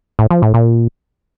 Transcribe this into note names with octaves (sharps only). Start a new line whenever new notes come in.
A2
F3
A2
A#2